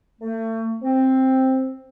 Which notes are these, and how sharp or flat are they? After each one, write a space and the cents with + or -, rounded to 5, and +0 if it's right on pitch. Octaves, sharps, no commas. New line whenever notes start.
A3 +35
C4 +5